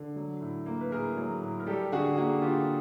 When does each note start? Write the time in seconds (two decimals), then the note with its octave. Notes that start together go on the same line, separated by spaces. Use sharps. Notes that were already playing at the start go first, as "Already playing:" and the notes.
Already playing: D3
0.16 F#3
0.41 A2
0.66 A#3
0.81 B4
0.91 A2 G#4 A#4
1.17 F#3
1.42 A2
1.60 A#4
1.66 G3 G4 A4
1.92 D3 F#4 G#4
2.17 A#3 F#4 G#4
2.42 D3 F4 G4